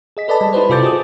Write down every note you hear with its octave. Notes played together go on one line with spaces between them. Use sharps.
G#4 D#5 B6
A4 B4 D5 D#5 A5
G3
D#4 E4 G4 B4 C5
C3 F4 A4 D6 G6 A6
F#4 G#4 D#6